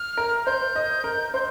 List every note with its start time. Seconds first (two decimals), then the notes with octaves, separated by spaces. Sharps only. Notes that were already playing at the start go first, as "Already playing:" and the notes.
Already playing: F6
0.17 A#4
0.46 C5 G6
0.76 D#5
1.04 A#4
1.34 C5 G6